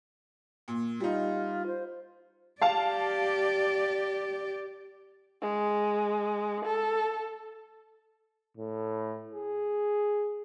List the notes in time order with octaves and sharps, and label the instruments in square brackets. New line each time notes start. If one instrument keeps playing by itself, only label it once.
[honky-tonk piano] A#2
[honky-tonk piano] G3 D#4 [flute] F4
[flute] C5
[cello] G4 D5 [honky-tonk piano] F5 A5
[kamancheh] G#3
A4
[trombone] A2
G#4